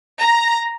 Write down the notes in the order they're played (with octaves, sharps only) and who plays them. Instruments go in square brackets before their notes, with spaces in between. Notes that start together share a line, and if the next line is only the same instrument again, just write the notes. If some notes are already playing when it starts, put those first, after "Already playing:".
[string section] A#5